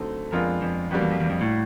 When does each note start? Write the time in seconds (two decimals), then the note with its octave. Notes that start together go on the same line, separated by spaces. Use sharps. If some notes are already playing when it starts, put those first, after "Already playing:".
Already playing: D3 F#3 A3 C4 D#4
0.32 F2 G#3 B3 D4 F4 A#4
0.62 F2
0.91 F2 G3 A#3 D4 F#4 B4
1.01 E2
1.11 F2
1.21 E2
1.30 F2
1.41 A2